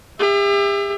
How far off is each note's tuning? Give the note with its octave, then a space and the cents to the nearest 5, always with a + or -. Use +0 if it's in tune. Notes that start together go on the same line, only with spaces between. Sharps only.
G4 +45 E5 +5